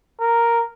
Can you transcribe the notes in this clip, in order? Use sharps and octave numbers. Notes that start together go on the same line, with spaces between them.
A#4